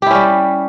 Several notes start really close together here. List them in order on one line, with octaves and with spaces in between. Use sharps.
G4 E4 C#4 G3